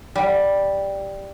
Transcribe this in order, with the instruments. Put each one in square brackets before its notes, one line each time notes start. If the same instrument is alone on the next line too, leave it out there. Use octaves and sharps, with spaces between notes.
[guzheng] G3